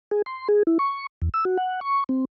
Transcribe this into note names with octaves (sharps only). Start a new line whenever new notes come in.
G#4
C6
G#4
E4
C#6
E2
E6
F#4
F#5
C#6
C4